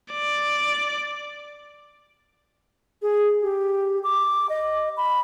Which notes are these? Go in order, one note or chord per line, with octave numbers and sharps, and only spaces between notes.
D5
G#4
G4
D6
D#5
B5